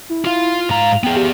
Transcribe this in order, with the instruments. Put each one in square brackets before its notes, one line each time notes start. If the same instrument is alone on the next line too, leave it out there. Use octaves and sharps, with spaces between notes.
[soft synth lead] E4
[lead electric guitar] F4 F5
[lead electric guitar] G#2 A#5 [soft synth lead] F5
[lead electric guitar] B3 G#4 [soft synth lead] G5
[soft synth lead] G4